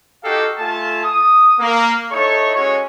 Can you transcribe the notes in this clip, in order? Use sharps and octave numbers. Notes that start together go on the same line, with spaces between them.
D#4 F#4 G4 A4 F5 G5
A3 F4 G#5 A5
D#6
A#3
D#4 E4 A4 C#5 C#6
G#3 C#4 F#4 C#5